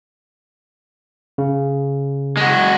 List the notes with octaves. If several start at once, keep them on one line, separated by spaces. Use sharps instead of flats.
C#3
G#3 F#4